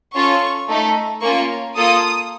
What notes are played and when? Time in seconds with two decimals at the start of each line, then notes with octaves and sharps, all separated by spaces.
0.15 C#4 F4 A4 C#6
0.69 A3 D#4 A4
1.21 A#3 C#4 F4 C#6
1.75 A#3 F4 A4 D#6